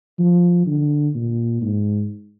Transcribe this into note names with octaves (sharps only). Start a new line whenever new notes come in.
F3
D3
A#2
G#2